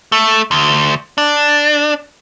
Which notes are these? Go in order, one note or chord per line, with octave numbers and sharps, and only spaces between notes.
A3
D2
D4